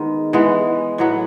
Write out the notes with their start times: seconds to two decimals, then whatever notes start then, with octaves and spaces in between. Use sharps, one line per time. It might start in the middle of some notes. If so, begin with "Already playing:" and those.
Already playing: D#3 G#3 B3
0.33 E3 G#3 B3
0.98 A2 F#3 B3